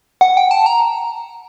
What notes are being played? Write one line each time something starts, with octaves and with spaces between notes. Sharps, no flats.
F#5
G5
A5
A#5